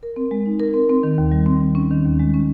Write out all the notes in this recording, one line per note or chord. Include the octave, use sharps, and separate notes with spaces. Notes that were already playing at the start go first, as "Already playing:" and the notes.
A#4
C4
G#3
D#4
A#4
C4
C4
D#3
D#2
G3
C4
D#3
C#4
D#3
D#2
G#3
C#4